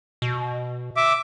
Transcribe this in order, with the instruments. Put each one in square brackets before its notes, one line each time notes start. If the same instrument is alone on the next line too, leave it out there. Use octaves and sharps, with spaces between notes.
[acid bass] B2
[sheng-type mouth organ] E5 D6